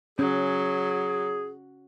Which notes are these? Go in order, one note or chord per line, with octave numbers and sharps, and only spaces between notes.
F#3 C#4 G#4